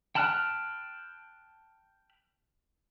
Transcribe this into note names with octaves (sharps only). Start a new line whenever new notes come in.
G5 A5 B5 F6 F#6